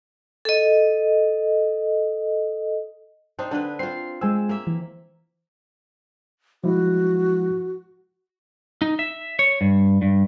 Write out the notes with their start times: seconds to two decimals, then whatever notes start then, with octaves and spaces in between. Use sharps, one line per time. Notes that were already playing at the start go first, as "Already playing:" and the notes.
0.45 A4 D#5
3.39 C4 D4 D#4
3.51 D3 D4 B4
3.79 C4 F4 C7
4.21 G#3 C4 G#5 E6
4.49 A#3 E5
4.67 E3
6.64 F3 G#3 E4 F#4
8.82 D#4
8.99 E5
9.39 C#5
9.61 G2
10.02 G2